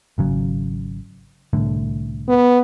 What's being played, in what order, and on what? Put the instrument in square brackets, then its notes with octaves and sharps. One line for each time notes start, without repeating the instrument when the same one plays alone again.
[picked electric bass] G#1 C#3 F#3
C2 A2 D3
[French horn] B3